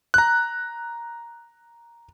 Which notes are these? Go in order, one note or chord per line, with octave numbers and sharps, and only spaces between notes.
A#5 F#6